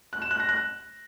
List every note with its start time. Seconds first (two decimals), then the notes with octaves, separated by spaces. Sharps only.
0.13 F#6
0.22 E7
0.31 F#6
0.40 A#6
0.49 F#6